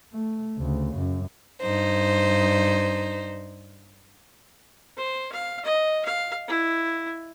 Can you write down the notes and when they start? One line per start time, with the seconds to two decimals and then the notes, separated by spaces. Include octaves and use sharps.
0.14 A3
0.58 D2 C#3
0.96 F#2
1.61 G2 D#4 C5
4.97 C5
5.32 F5
5.65 D#5
6.05 F5
6.48 E4